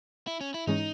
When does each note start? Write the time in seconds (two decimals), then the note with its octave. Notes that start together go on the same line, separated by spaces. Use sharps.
0.27 E4
0.41 C#4
0.54 E4
0.67 G#2 E3 G#3 C#4 D#4